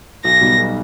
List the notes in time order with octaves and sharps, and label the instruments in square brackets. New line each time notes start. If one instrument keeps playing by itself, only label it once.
[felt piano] B1 [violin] A#6
[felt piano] B2 G3 B3 D#4
B1